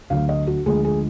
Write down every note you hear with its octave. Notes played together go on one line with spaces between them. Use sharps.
D2 D3 F#3 F5
D#5
F#4
D2 D3 F3 G#3 G#4
G#4